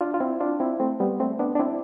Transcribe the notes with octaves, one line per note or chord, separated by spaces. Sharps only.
D4 F4
F4
C4 E4
D4 F4
C4 E4
A3 C4
G3 B3
A3 C4
B3 D4
D4
C4 E4